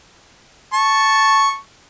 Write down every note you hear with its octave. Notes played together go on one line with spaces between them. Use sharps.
A5 C#6